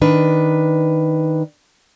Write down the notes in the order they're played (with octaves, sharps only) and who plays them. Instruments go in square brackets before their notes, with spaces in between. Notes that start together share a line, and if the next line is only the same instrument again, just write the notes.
[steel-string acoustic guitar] D#3 D4 B4